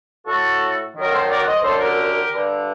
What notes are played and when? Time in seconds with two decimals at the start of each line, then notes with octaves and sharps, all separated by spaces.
0.27 A2 F#4 A4
0.95 F#2 D#3 A#4
1.12 A4 C5
1.29 A#4 D5
1.41 F#5
1.46 C5 D#5
1.63 F#2 D3 A4 C5
1.80 G4 A#4
2.31 G2 D3